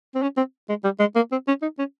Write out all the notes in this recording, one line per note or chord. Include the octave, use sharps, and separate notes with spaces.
C4
C#4
C4
G#3
G3
G#3
A#3
C4
C#4
D#4
C#4